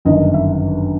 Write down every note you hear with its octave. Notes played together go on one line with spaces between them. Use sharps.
G1 F#2 D#3 D#5
E5